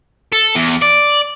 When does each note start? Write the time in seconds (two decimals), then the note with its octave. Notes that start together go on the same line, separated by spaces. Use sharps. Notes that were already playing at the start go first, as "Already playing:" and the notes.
0.32 A4
0.55 E2
0.82 D5